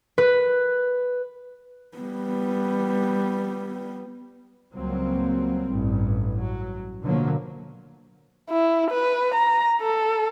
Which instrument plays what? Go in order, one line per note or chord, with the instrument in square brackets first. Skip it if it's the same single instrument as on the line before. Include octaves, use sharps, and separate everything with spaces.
[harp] B4
[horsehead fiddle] G3 B3
[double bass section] C#2 F#3 G3 A#3 C4
A1 G2
F#3
B2 D3 F3 F#3 A#3
[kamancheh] E4
B4
A#5
A4